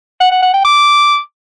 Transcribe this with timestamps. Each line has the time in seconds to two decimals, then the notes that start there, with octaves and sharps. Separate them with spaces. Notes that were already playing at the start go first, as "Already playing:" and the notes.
0.20 F#5
0.31 F#5
0.42 F#5
0.53 G5
0.65 D6